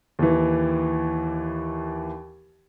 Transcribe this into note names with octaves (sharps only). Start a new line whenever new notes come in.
D#2 E3